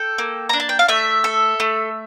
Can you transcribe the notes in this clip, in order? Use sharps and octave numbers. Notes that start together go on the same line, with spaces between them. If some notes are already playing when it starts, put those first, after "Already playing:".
Already playing: A4 G5
A#3
D4 A#5
A5
G5
F5
A3 E5
A4
A3